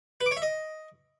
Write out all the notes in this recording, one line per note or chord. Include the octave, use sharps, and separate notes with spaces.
B4
D6
C#5
E5
D#5